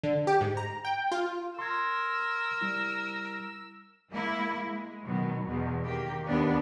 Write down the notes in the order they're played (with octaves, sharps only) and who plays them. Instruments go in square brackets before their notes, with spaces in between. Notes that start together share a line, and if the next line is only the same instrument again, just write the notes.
[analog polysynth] D3
G4
G#2
A#5
G5
F4
[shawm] A#4 [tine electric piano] C6 G#6 [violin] E6
[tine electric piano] G3 E4
[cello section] G#3 A#3 E4
G#3
B2 D#3 F#3
E2 B2
D#3 A#3 G4
D#2 B3 D4